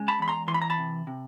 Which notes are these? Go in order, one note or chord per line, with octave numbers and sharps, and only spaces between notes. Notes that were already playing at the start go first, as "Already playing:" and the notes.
Already playing: C#3 G#3
A5 B5
E2 B5
A#5 C6
E3 C6
B5
A#5
A5 B5
C3
C3